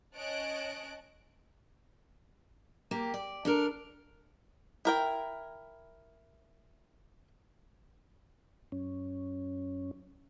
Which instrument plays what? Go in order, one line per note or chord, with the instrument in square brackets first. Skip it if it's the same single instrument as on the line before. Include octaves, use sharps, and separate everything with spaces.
[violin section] C#4 C#5 D#5 A5 F#6 D7
[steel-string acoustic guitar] A#3 G4
D5
D4 A4 A#4
[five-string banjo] E4 A#4 G5
[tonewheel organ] F#2 C#4